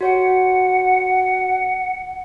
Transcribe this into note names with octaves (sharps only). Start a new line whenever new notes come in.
F#4 C#5 F#5